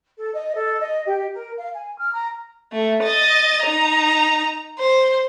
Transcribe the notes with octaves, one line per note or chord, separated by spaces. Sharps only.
A4
D#5
A4
D#5
G4
A#4
F5
G#5
F6
A#5
A3
D#5 A6
D#4 A#5
C5